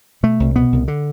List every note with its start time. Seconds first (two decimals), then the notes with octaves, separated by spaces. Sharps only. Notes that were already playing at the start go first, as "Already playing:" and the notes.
0.23 B2 A3
0.40 C2
0.56 B2 B3
0.72 C2
0.88 D3